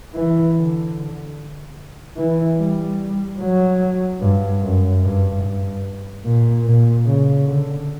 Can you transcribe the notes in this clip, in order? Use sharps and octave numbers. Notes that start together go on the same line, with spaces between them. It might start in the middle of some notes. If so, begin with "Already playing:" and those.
E3
D3
E3
G3
F#3
G2
F#2
G2
G2
A#2
A#2
C#3
D3